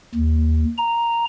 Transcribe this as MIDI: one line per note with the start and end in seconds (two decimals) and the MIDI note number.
0.15 0.65 39
0.78 1.25 82